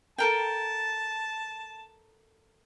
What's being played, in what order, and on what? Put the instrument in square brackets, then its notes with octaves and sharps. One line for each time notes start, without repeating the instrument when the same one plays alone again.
[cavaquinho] A4 A#4 G5 [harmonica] A5